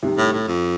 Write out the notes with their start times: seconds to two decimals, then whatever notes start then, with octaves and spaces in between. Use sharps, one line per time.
0.02 C2 C3 D#3
0.18 A2
0.33 A2
0.48 F2